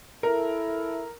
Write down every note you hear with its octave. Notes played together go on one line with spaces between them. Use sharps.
E4 A4 A#4